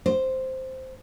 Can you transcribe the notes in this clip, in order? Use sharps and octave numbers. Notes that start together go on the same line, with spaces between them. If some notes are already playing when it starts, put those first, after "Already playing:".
C5